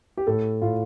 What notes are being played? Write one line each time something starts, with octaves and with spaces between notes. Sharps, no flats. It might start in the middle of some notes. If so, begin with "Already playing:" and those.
G4
A2 A4
A2 F4